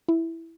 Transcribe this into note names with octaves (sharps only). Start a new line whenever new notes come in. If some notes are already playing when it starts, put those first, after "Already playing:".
E4